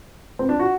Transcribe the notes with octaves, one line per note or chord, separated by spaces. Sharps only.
C4
D4
F#4